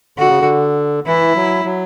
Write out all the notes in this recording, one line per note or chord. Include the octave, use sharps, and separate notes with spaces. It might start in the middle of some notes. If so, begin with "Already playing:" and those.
D3 F#4
C#3
D3
E3 E4
F#3
F#3